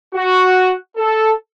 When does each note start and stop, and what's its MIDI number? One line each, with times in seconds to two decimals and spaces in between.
0.14 0.71 66
0.97 1.32 69